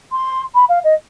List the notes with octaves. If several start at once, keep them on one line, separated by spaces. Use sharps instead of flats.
C6
B5
F5
D#5